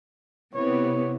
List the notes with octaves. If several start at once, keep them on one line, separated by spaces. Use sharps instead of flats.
C3 B3 E4 C#5